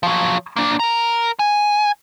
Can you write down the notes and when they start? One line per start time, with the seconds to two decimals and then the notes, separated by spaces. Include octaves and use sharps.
0.03 F3 F#3
0.56 A#3 D4
0.80 A#4 A#5
1.39 G#5